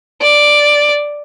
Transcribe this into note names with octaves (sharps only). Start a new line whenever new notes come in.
D5